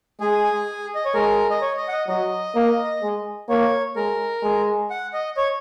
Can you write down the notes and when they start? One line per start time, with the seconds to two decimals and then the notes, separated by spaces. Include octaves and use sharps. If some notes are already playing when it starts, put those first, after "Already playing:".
0.20 G#3 G#4
0.95 D#5
1.05 C#5
1.14 G#3 A#4
1.50 D#5
1.61 C#5
1.77 D#5
1.88 F#5
1.92 D#5
2.08 F#3 D#5
2.55 A#3
3.03 G#3
3.49 A#3 C#5
3.96 G#3 A#4
4.43 G#3
4.90 F#5
5.13 D#5
5.37 C#5